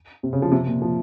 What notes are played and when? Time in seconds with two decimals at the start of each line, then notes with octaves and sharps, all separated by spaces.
0.23 C3
0.33 C#3
0.42 F3
0.52 C3
0.67 A#2
0.82 F3